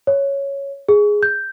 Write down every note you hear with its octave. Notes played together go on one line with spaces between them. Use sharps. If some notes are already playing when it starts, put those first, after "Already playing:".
C#5
G#4
G6